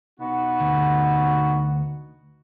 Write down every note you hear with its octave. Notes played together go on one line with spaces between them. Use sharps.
B2 B3 D#4 F#4
D2